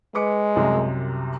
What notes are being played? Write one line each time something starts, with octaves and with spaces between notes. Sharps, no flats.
G#3 B4 D6 C#7
C2 F#2 C3